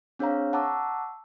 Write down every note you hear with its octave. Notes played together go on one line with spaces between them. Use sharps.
C4 D4 G#4 C#5 F5 A#5
F#5 A5 A#5 C#6 D6 E6